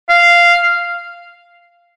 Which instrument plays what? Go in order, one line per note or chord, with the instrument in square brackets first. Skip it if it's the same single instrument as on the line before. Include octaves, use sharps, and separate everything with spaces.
[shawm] F5